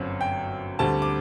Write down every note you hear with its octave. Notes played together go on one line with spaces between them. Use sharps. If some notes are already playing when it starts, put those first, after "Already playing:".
Already playing: G1 F#2 F#3 C4
G5
D2 D3 G3 C4 A5
D6